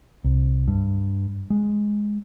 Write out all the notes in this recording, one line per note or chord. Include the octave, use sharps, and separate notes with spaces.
C2
G2
G#3